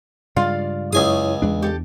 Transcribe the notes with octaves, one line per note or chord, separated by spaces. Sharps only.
G2 C#3 G#3 F4 D5 F5
C#2 F#2 E4 G#4 C#5 G#5 D#6
E2 G#3 D4
G4 A4